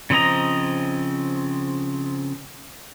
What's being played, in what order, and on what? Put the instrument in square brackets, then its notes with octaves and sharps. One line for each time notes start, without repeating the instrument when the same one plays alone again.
[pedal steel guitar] C#3 F3 C4 D#5 A#5